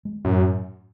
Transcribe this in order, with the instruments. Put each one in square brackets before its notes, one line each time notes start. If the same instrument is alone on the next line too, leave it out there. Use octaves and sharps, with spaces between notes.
[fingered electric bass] G#3
[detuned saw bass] F#2 [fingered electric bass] A2